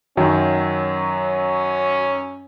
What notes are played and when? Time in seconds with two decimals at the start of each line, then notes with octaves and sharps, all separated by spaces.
0.17 F#2 D#3 F#3 C#4